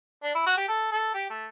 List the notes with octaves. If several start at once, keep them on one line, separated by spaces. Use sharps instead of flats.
D4
E4
F#4
G4
A4
A4
G4
A3